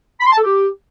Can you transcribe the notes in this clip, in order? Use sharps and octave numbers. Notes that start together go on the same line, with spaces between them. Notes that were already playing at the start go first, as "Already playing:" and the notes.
B5
C6
A5
A4
G4